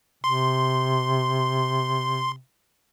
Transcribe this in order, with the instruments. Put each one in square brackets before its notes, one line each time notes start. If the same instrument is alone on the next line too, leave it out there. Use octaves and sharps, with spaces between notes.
[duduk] C3 [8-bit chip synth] C6